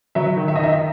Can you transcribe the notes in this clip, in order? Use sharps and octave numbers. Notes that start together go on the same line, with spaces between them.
F#3 E5
D#3
E5
D#5
D#3 E5